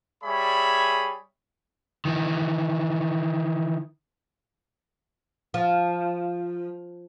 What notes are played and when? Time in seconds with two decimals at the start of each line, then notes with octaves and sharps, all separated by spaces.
0.24 G3 G#4 C#5 E5 B5
2.05 D#3 E3
5.54 F3